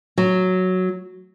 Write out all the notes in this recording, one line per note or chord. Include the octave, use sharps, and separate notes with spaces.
F#3